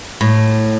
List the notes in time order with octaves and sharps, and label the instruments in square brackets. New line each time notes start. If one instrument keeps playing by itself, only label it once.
[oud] A2